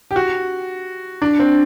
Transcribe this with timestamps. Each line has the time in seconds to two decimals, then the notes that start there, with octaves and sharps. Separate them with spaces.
0.11 G4
0.16 F#4
1.22 D4
1.40 C4